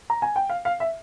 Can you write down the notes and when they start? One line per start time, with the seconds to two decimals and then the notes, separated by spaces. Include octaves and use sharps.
0.10 A#5
0.22 G#5
0.36 G5
0.50 F5
0.65 F5
0.80 E5